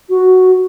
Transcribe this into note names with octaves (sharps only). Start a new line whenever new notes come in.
F#4